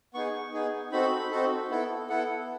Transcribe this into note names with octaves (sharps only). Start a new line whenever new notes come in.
B3 D#4 G#4 C#6
B3 D#4 G#4
C4 D#4 F#4 A4 B5
C4 D#4 F#4 A4
B3 E4 A4
B3 E4 A4 F#5